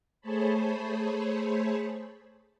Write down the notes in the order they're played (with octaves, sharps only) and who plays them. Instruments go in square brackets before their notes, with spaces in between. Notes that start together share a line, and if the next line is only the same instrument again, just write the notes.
[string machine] A3 G#4 C5 C#5 A5 B5